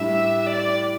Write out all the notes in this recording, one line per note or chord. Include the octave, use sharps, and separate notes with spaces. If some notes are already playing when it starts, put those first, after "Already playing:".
Already playing: A2 G3 D4 G4 E5
D5